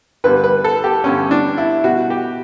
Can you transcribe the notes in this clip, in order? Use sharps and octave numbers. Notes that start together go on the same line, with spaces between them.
G2 D3 G3 B4
B4
A4
G4
G2 D3 G3 C#4
D4
E4
B2 G3 F#4
G4